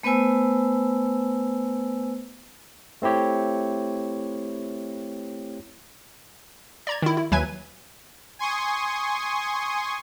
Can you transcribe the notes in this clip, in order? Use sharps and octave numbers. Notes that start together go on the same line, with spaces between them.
A3 B3 B4 C5 G#5 E6
A3 C4 E4 G4 C#5
D5 A#5 G#6
D#3 E4
E4
D#2 F#3 B4 E5 G#5 G#6
G#5 C6 C#6 D#6